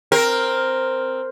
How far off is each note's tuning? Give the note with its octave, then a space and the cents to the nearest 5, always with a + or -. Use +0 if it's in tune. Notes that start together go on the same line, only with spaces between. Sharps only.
C4 +0 A#4 +0